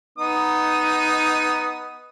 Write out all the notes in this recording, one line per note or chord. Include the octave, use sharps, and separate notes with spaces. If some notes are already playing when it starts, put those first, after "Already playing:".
B3 D#4 D#6